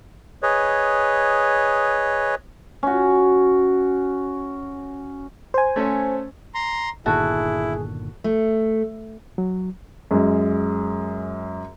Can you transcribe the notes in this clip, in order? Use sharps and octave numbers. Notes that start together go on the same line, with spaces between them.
G#4 B4 C#5 D#5
C#4 F#4
C5 G#5
A3 C#4
A#5 C6
G1 A#2 D#3 E4 F#4 G#4 A4
A3
F#3
F#2 G#3